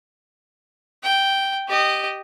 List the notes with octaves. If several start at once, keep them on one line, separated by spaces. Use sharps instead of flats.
G5
G4 D#5